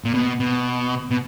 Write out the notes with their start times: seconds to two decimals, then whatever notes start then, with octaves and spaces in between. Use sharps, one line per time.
0.04 A#2
0.14 B2
0.40 B2
1.10 B2